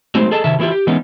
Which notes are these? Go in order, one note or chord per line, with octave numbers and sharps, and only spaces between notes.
F#3 G#3 A3 C4 D#4 C5
G#4 A4 D#5 A5
C3 D#3 E5 A5
E3 G#3 A#3 E4 F4 G4
G4
E3 G#3 B3 C#4 D#4